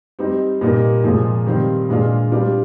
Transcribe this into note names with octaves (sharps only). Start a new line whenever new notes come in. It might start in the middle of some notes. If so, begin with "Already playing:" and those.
G3 C4 D#4
A#2 G3 A#3 D#4
A#2 F3 G#3
D#3 G3 C4 F4
A#2 G#3 D4 F4
G3 D4 F4